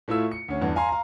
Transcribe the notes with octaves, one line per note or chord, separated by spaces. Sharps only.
A2 A3 E4 F4 E6
C#7
D2 C#4
E2 G2
F5 G#5 A#5 C6
F5 A#5